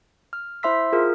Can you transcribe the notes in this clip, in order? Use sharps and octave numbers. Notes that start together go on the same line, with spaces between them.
F6
E4 C5 E5 C6 E6 B6
F4 G#4 A#4